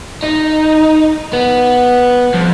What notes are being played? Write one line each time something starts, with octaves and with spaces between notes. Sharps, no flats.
D#4
B3
F2